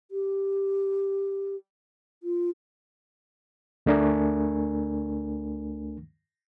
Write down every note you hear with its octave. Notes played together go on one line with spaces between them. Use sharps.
G4
F4
D2 A3 D4 A#4 G#5